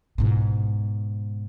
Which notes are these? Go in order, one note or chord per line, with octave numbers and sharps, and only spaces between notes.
G#2 B2